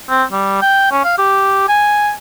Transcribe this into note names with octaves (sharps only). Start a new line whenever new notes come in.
C4
G3
G5
C#4
F5
G4
G#5